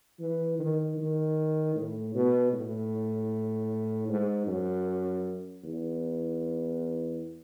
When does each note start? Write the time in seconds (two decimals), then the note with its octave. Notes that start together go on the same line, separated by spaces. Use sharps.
0.20 E3
0.59 D#3
0.97 D#3
1.75 A2
2.14 B2
2.53 A2
4.08 G#2
4.47 F#2
5.64 E2